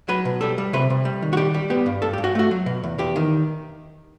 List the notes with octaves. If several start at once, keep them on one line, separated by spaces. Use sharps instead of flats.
F#3 B4
B2
G3 A4
G3
C3 B4
C3
G3
D#3
F#4
G3 G4
G3
B3 G4
G2
G2 A4
G4
G2
F#4
A3 F#4
F#3
B2
E2
E2 G4
D#3